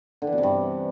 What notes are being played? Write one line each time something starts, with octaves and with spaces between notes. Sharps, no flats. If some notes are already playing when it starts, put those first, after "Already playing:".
D3
E3
B2
C3
G2